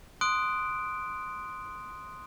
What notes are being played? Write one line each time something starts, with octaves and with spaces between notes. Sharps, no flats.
C6 D#6 F#6 D7